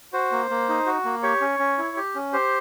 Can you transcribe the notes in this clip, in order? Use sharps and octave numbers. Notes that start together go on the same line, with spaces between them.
F#4 C5
A#3
A#3
D#4
F#4
A#3
G4 C#5
C#4
C#4
E4
G4
C#4
G4 C5